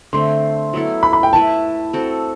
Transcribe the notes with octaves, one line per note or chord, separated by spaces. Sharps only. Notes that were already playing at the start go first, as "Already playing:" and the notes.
D3 A3 C4 C6
F#3 B3 E4 A4
B5
B5
G5
A3 E4 B4 E5 A5
C4 F#4 A4